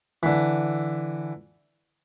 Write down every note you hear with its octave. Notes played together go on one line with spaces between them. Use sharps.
D3 E3